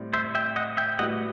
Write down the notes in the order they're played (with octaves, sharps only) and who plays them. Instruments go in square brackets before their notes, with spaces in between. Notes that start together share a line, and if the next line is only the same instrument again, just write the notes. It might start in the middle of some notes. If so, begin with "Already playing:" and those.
Already playing: [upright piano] A2 G3 C4
[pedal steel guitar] C5 E5
E5 G5
D#5 F#5
E5 G5
[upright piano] A2 G3 B3 F#4 [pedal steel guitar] D#5 F#5